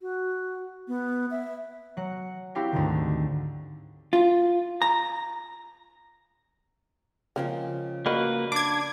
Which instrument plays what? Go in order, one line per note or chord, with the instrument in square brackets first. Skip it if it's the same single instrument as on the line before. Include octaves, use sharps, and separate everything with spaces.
[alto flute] F#4
B3
E5
[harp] F#3 F#5 C#7
C4 E4 F#4 G4 F5 G5
D2 G#2 D3 D#3
[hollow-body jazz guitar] F4
A#5
[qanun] C#3 F3 G#3 [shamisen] A#3 C4
[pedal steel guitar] A#3 B4 [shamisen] F#4 A#4 D#5
[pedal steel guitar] D4 [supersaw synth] D6 G#6